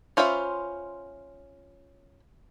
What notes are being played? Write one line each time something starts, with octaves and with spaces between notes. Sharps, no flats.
C#4 F4 C5 E5 B5